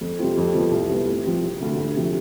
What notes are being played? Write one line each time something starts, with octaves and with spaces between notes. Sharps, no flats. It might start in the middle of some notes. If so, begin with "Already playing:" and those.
F2
C3 G3 C4 F4
F2
C3 F3 B3
C2
C3 G3 B3
A2
F3 C4 G4
E1
D2 C3
D2
C3 F3